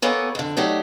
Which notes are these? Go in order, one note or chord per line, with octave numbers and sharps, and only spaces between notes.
A#3 B3 A4 C#5 G#5
F2 D3
F#3 A3 D#4 G4 D5